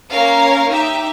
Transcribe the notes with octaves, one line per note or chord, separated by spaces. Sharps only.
A#3 C#4 A#4 C#5 F5
D#4 G4 E5